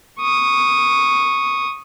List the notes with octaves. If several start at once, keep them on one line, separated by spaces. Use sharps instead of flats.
C#6 D#6